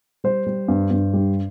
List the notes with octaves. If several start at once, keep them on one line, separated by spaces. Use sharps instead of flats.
G3 C5
G3
G2
G2
G3